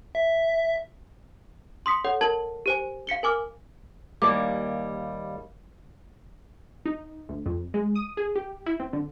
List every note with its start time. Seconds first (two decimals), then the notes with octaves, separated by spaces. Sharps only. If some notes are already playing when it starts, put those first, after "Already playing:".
0.15 E5
1.86 C6 D#6 B6 C#7
2.04 A4 C#5 F#5
2.21 A#4 A5 G#6 F#7
2.66 G4 C5 G#5
3.07 F5 B6 C#7 G7
3.23 A#4 G#5 D6 F6
4.22 D#2 G3 A#3 D6
6.85 D#4
7.29 D2
7.46 F2
7.74 G#3
7.95 D#6
8.17 G#4
8.36 G4
8.66 E4
8.80 C4
8.93 D3